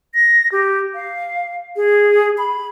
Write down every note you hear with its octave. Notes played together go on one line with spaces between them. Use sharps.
A#6
G4
F5
G#4
B5